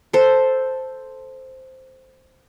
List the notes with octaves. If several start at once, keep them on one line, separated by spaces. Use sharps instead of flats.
A4 C5